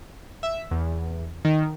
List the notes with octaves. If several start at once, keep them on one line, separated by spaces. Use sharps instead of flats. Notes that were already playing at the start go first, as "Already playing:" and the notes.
E5
E2
D#3